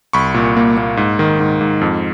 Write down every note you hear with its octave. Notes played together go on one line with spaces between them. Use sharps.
C2 B5 C#6
A#2
A#3
A#3
G#2
D#3
G#2
G#2
F2